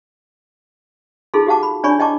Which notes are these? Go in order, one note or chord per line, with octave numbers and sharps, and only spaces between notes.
D#4 F4 G#4 A4 C6
F#4 G4 F5 F#5 A5 D6
B5
D4 C#5 D5 G#5 B5 C#6
E4 D#5 G5 A5 C#6 D6